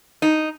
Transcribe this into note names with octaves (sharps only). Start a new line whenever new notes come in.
D#4